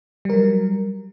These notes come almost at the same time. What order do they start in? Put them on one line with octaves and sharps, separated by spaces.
G3 A#4 F#3